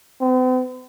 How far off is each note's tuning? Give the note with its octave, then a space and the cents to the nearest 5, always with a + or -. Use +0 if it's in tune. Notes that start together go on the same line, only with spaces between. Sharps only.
C4 -45